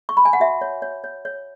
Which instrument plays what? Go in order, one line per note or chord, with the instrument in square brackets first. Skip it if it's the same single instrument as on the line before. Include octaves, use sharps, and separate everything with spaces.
[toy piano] C#6
B5
G#5
F#5
F#4 E5
C#5
C#5
C#5
C#5